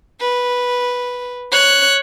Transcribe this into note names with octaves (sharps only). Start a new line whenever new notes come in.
B4
C#5 F#6